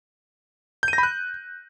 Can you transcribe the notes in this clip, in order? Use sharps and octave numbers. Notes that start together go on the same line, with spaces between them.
G6
D#7
A#6
B5
F#6